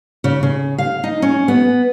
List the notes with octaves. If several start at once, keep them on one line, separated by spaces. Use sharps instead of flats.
C#3
C#3
F5
D#4
C#4
B3